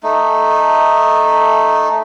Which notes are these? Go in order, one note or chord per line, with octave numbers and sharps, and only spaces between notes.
A3 D#4